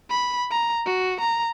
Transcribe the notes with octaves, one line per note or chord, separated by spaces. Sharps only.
B5
A#5
F#4
A#5